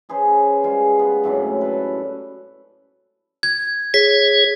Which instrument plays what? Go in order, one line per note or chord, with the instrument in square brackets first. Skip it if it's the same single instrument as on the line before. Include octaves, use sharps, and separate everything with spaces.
[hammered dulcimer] C#4 G#4 B4 C5
G3 G#3 F4 G#4
B3
F#2 A2 C3 D4
A4 B4
[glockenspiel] G#6
[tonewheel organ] G#4 C#5 [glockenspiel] B6